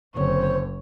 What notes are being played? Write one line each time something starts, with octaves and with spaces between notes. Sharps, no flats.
F#1 D3 C4 C5 C#5